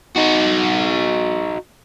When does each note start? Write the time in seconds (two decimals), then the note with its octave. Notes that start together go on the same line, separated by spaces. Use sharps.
0.16 D#4 F#4